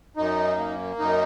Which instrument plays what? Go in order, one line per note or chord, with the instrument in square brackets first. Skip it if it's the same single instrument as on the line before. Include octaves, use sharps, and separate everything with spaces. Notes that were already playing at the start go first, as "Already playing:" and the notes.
[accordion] F#2 D#4
A#3
F#2 D#4